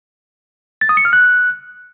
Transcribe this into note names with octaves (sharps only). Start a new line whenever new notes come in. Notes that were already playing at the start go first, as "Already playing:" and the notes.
A6
D#6
C#7
F6
F#6